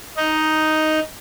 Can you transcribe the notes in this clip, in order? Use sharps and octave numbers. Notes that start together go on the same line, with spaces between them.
D#4